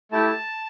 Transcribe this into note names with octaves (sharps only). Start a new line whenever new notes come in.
A3 E4 G4 A5